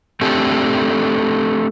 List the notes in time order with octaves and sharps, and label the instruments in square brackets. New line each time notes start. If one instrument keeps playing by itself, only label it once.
[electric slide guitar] A3 C4 D4 G4 A4